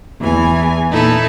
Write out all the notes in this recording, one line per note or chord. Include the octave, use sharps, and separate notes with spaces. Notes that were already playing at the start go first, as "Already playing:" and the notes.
E2 E3 G#5
A#2 D#4 E4 A4